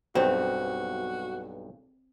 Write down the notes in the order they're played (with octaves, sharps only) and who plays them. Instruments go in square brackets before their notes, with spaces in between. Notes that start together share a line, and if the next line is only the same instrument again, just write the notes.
[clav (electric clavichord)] B1 G2 [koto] C4 [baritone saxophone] F#4